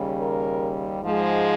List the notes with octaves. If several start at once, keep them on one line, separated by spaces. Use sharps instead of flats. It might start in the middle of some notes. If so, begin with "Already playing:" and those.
Already playing: D#2 C#3 G3
A#4
G#2 F3 G#3